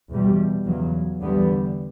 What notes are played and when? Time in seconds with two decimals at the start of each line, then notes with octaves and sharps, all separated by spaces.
0.09 E2 B2 G3
0.65 E2 C#3 F#3
1.21 E2 D3 G3 B3